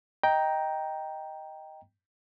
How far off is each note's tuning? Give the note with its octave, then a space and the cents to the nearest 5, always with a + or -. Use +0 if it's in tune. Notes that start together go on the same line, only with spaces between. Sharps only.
D#5 +5 G5 +0 A#5 +5